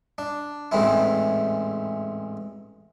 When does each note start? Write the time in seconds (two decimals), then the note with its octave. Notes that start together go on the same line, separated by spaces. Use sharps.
0.18 D4
0.71 A1 E2 G#2 E3 C4 E4